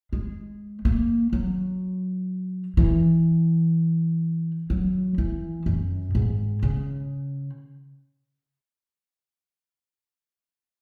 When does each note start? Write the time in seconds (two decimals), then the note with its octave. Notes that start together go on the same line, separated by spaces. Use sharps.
0.13 G#3
0.85 A#3
1.33 F#3
2.77 E3
4.70 F#3
5.18 E3
5.66 F#2
6.15 G#2
6.63 C#3